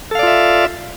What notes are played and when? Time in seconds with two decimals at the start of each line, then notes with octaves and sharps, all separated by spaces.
0.11 A4
0.15 F5
0.19 D5
0.23 F4
0.27 E5